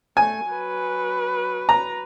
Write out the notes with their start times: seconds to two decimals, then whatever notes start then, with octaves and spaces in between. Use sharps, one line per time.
0.17 A3 G#5
0.50 F#3 B4
1.69 A#5